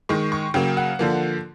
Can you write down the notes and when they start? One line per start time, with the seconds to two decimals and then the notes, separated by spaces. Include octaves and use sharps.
0.09 D#3 G#3 C#6
0.32 C#6
0.54 C#3 F#3 A#3 G5
0.77 F#5
0.99 D3 F3 A#3